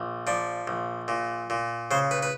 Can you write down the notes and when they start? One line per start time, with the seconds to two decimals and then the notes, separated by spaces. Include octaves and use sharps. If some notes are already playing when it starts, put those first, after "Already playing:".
Already playing: A#1
0.27 F3 D5
0.68 A#1
1.08 A#2
1.50 A#2
1.91 C#3 C5
2.11 B4
2.23 B4